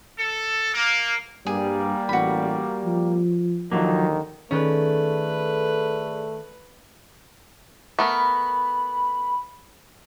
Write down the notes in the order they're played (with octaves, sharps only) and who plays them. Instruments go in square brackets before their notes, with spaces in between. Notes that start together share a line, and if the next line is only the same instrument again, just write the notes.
[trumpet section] A4
A#3
[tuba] G2 [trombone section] G3 A#3 [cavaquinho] G#4
[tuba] A1 [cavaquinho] F#4 B5
[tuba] F3
[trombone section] D#2 D3 D#3 [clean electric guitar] F3 F#3 A#3
[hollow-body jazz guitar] D#3 C#4 [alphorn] A3 [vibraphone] G#4 A4 D5 [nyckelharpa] B4
[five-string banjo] A3 B3 A#4 [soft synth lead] B5